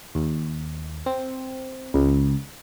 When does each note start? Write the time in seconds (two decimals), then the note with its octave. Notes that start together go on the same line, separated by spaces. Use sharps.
0.15 D#2
1.06 C4
1.94 C#2